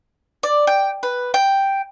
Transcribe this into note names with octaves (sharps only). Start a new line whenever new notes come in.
D5
G5
B4
G5